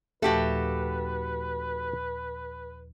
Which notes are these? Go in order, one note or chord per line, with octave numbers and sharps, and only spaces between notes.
D#2 A#2 F3 A3 F#4 G4 A4 B4